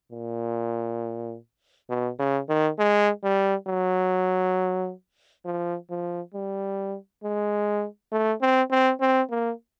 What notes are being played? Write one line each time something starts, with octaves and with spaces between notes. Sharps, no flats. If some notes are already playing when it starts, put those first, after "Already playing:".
A#2
B2
C#3
D#3
G#3
G3
F#3
F3
F3
G3
G#3
A3
C4
C4
C4
A#3